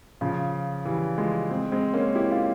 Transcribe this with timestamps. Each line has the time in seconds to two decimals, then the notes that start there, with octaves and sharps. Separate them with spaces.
0.21 C#3 F3
0.85 E3 G3
1.18 F3 G#3
1.50 G#3 C4
1.72 G#3 C4
1.93 A#3 C#4
2.15 E4 G4
2.31 C#4 F4